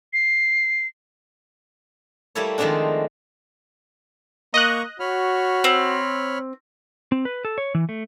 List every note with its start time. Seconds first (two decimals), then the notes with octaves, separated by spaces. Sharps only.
0.13 C7
2.35 G3 A3 A#3 E4 A4 C#5
2.58 D#3 F3 G#3 A3 C4 D4
4.54 A#3 D#5 A#5 C#6 F#6
5.00 F#4 C#5 B5 F6
5.64 C4
7.12 C4
7.25 B4
7.45 A4
7.58 C#5
7.75 E3
7.89 A3